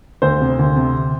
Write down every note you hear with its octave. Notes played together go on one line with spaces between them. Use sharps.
D2 C5
C3
D2
C3